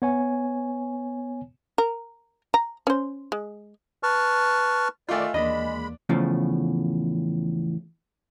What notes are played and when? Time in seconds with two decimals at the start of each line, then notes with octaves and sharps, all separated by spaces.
0.02 B3 C#5 G#5
1.78 A#4
2.54 A#5
2.87 C#4 C5
3.32 G#3
4.03 B4 A5 C#6 F6
5.09 D#3 A3 F4 D5 D#5 F5 G#5
5.34 D#2 E3 G#3 A#3 D4 D#5 B5
6.09 E2 A2 C#3 F3